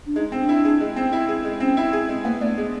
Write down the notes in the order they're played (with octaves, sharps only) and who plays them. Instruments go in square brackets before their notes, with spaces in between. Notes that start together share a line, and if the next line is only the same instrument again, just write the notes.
[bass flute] D4
[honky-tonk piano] G#3 [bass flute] D#4
[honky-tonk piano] C4
[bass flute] D4
[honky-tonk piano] E4
G#4
G#3
C4
E4
G#4
G#3
[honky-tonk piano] C4 [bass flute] C#4
[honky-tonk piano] E4
G#4
[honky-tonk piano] G#3 [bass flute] C4
[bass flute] A#3 [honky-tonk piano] B3
[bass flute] A3 [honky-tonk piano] D4
[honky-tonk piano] G#3 [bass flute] B3